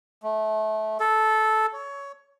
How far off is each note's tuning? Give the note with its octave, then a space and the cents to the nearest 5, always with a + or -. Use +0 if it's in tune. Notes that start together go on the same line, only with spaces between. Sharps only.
A3 -25
A4 -10
C#5 +15